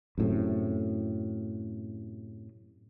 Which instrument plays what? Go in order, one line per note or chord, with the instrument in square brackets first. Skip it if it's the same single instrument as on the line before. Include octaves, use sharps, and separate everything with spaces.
[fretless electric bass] F#2 A2 C3